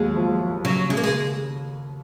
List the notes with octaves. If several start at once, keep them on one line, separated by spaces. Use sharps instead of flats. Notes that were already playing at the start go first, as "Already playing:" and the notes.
Already playing: D#2 F#3 G#3
F3
F3
C#3 F#3
C#3 G#3
A#3
G#3